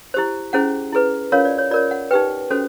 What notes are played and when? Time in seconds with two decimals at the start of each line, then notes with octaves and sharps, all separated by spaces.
0.14 E4 G4 C5
0.53 C#4 E4 G#4 C5 F#5
0.93 E4 G#4 B4
1.32 C#4 F4 A#4 C#5 F5
1.45 D5
1.58 C#5
1.71 F4 A#4 C#5 D5
1.91 F#5
2.11 D#4 G4 B4 G5
2.51 C#4 F#4 A4 C5